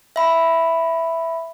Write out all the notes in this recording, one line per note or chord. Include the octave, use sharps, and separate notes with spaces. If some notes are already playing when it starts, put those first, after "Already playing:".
E5 B5